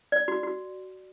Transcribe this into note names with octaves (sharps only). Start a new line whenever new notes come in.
D5
F#4
F#4